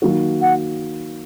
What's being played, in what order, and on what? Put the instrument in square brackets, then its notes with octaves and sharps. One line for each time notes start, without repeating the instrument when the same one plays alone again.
[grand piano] D#3 F#3 A#3 F#4
[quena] F#5